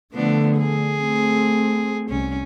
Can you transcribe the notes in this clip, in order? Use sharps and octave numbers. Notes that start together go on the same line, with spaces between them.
D3 F3 A3 B3 D4
G#4
A3 C4
C2 C#4